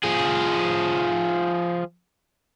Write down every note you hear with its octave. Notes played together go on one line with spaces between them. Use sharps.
F3 G#4